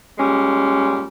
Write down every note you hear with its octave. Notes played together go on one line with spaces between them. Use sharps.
A#2 G3 G#3 C#4